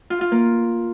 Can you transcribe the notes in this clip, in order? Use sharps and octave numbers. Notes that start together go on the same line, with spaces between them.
F4
F4
A#3